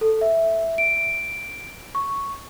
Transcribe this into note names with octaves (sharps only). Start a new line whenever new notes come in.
A4
E5
D7
C#6